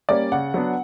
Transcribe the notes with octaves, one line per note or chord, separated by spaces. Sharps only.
G3 A#3 C#4 D5
C#3 F#5
F#3 B3 D4